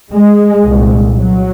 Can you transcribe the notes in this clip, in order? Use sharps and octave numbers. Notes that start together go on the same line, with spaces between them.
G#3
C2 A#2
F#3